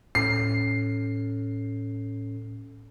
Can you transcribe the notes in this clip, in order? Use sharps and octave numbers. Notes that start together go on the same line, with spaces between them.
A2 C#4 A4 C7